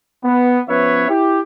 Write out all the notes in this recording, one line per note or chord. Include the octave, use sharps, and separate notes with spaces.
B3
F3 B3 C#4 B4 C#5 E5
E4 G4